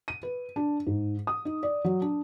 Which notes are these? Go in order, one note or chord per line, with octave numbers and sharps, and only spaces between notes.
D#7
B4
D4
G#2
D#6
D#4
D5
F#3
D4